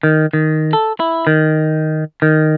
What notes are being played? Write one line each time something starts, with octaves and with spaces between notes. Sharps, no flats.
D#3
D#3
A4
E4
D#3
D#3